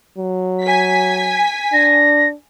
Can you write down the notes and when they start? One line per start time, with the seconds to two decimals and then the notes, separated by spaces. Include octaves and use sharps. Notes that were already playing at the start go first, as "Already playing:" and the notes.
0.18 F#3
0.64 G#5 B6
1.73 D4 A#6